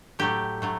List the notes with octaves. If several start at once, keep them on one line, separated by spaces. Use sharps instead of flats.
A2 F#3 A3 G4
A2 F#3 A3